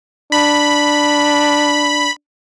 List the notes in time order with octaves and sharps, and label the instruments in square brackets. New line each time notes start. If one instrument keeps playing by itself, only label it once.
[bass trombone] D4 [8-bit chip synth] B5